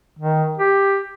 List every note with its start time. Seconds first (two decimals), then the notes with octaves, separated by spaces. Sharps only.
0.19 D#3
0.58 G4